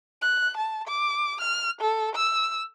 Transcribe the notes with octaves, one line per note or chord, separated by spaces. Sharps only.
F#6
A5
D6
F6
A4
E6